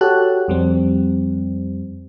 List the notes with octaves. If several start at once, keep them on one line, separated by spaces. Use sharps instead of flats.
F#4 G4 A4 C#5 A5 F#6
F2 G3 C4